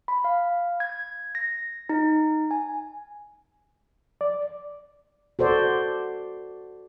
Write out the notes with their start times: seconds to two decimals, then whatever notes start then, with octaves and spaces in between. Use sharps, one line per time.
0.08 B5
0.24 F5
0.80 G#6
1.35 A#6
1.89 D#4
2.51 G#5
4.21 D5
5.39 F#4 A4 C5 D5